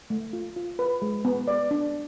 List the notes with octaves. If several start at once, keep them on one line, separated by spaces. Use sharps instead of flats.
A3
F4
F4
B4
G#3
B3
D5
D4